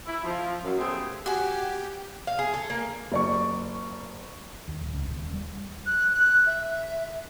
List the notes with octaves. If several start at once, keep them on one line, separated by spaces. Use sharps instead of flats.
E4
F3
F#2
G#3 A3 B3 C4 G4 G#4
F#4 G4 G#5
F5
G#4
A4
A#3
F#1 D5 C#6
D#2
D1
C#2
D#1
G3
F#6
F#6
E5